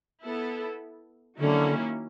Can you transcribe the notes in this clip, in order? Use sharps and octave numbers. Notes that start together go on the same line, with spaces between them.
B3 E4 A4
D3 D#3 F#3 A#3 C#4 E4